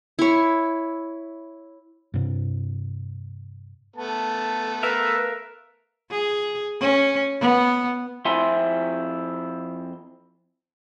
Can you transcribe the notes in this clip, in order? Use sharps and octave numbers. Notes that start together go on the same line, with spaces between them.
E4 C#5
G2 C3
A3 B3 A5
A#4 B4 E5 F5
G#4
C#4
B3
F2 C4 E4 E5 G#5 C6